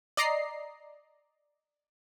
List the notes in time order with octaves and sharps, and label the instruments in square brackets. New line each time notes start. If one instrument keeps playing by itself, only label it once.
[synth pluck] D5 D#5 A#5 C7